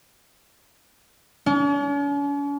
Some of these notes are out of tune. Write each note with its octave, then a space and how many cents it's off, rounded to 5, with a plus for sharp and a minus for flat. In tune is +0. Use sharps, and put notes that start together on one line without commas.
C#4 +45